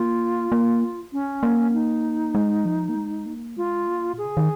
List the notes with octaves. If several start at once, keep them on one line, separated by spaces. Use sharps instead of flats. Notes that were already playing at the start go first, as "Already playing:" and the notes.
Already playing: A#3 F4
A#3
C#4
A#3
D#4
G#3
F3
A#3
G#3
A#3
G#3 F4
A#3
A#2 G#4
C#3
D#3